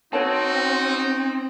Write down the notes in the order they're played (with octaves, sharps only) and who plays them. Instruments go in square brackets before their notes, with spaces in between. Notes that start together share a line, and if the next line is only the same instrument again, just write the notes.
[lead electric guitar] C4 [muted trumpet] D#4 [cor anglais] F#4 [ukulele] B4 C#5 A5